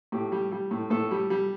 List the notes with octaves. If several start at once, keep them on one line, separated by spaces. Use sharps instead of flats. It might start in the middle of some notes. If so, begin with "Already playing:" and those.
A2 G4
G3
G3
A2
A2 A4
G3
G3